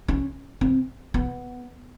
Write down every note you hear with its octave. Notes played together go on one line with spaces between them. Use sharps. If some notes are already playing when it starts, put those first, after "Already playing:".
C#4
C4
B3